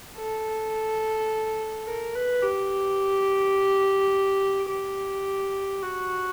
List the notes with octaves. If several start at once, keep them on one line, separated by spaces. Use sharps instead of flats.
A4
A#4
B4
G4
G4
F#4